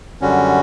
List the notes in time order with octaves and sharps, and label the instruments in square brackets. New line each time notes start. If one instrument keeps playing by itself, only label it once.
[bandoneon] F#2 D3 G3 C#4 F#4